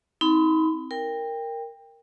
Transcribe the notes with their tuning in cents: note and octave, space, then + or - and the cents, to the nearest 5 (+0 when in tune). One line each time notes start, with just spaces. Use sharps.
C4 +0 D#4 +35 B5 +20
A#4 -5 G5 +20